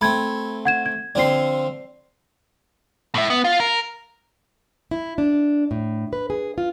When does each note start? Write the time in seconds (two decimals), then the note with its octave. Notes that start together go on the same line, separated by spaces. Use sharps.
0.01 A3 C4 B5 G#6
0.65 F#5 G#6 E7
0.86 G#6
1.15 D3 F3 C4 D5 C7
3.15 A2 E5
3.30 B3
3.44 F4
3.60 A#4
4.91 E4
5.18 D4
5.71 A2
6.13 B4
6.30 G#4
6.58 F4